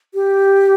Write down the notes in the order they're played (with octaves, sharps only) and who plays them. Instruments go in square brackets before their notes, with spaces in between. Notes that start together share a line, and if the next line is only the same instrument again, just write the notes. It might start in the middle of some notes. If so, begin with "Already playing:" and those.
[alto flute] G4